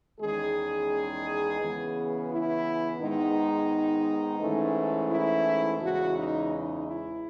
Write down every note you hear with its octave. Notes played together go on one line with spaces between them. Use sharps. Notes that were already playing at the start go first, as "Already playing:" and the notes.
E2 D#3 G#3 C#4 G#4
C#3 E3 B3
E4
G#2 D#3 G#3 B3 D#4
G#2 E3 A3 C#4
E4
E2 C#3 E3 G#3 F#4
D#4
D#4
E4